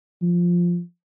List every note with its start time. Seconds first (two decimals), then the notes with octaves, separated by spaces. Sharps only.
0.22 F3